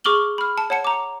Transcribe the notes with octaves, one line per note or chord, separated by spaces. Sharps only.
G#4 C#6 D6 F6 F#7 G7
B5 F6
A5
C#5 F#5 A5 C#7
A#5 D6